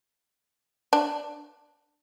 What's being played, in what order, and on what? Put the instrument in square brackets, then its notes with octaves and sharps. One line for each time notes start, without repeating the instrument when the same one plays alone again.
[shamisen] D4